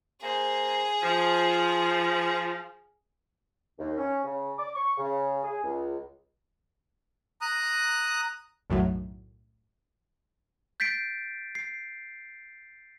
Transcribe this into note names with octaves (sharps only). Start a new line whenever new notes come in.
A#3 G#4 C5
F3
D#2
C#4
C#3
D6
C#6
C#3
G#4
C#2
A#5 D#6 F#6
B1 F#2 A2 D#3 F#3
G6 A6 B6 C7 D7
C7